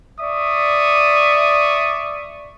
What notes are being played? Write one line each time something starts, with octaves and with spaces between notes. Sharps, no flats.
D5 E5 C#6 D#6